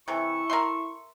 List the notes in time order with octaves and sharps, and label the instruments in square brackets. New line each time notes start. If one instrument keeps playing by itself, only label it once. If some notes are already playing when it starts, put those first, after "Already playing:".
[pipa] C3 E3 [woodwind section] E4 A4 C#6
[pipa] A#4 E5 C6